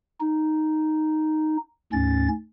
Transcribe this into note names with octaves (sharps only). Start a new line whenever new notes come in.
D#4
D2 G#2 C#4 A6